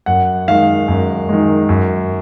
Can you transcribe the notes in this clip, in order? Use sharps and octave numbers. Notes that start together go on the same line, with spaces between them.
F#2 F#5
D#3 G#3 F5
F#2
D#3 G#3
F#2